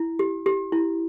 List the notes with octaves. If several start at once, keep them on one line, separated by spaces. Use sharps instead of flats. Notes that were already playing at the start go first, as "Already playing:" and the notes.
Already playing: E4
G4
G4
E4